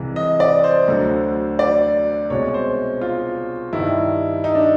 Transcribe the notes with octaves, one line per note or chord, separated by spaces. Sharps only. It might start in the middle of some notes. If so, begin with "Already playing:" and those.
Already playing: C2 C3 E3 G#3
D#5
D5
C5
D2 D3 F#3
D5
C2 B2 G#3 C#5
C5
F4
G2 D#3 G3 E4
D#4
D4